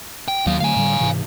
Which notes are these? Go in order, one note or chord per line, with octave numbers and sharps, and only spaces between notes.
G5
D#2 D#3 F#3 F5
D3 F#3 A3 F5 G#5
A2 D3 G3
G#2 C3 E3